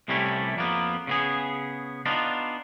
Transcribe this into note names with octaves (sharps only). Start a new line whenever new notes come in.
C2 C3 G3 A3 C#4 E4
F2 A#3 B3
C#3 B3 G#4
B3 D4 D#4 F4